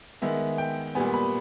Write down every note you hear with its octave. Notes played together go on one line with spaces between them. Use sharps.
D#3 G#3 B3 E5
G5
A#2 G3 B3 G#5
B5